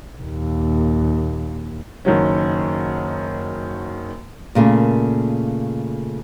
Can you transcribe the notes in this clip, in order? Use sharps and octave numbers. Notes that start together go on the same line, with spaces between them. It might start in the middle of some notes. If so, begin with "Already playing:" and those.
D#2 A#2
F#1 D#3 F#3 C#4
A#2 C#3 A3 A#3